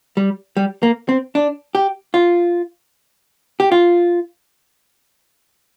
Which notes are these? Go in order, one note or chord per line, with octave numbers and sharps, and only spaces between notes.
G3
G3
A#3
C4
D4
G4
F4
G4
F4